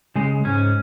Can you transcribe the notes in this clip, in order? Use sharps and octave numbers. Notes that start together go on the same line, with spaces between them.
C#3 G#3
G#2 C#4